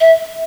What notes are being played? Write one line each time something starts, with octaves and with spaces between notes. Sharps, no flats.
E5